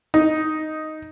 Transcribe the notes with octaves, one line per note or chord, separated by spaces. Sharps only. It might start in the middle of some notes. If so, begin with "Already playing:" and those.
D#4